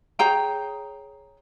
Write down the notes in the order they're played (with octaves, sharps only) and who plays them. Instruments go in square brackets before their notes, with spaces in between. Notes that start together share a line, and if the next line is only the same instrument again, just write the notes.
[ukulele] G#4 C#5 G5 A#5